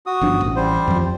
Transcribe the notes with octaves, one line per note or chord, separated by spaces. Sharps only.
F#4 D#6
G1 F3 D4
A1
G3 C5
F2 F3